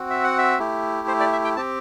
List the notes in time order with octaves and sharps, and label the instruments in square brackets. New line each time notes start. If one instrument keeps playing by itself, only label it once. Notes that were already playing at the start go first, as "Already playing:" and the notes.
Already playing: [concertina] C4 F#4
E5
F#5
E5
A3 E4 G4
C5
D5
E5
G5
C4 G4 A5